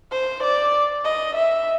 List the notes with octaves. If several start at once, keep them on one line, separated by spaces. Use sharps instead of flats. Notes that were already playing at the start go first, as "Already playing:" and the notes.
C5
D5
D#5
E5